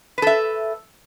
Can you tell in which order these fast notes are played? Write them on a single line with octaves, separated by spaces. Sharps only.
B4 A4 E5